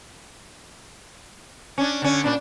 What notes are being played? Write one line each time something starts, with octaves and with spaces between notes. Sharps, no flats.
C#4 D4
D3 C#4
A#2 D4